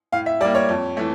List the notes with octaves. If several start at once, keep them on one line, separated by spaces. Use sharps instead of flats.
A2 F5
E5
G3 A#3 D5
C#5
F2
E3 A3